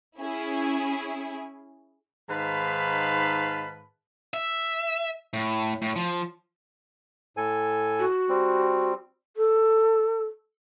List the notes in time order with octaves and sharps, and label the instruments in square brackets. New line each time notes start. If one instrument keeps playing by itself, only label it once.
[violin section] C#4 E4 G#4
[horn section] G#2 D#3 B4 F5 A5 B5
[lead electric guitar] E5
A2
A2
F3
[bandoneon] A2 A4 G#5
[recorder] F#4
[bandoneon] G3 C4
[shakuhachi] A4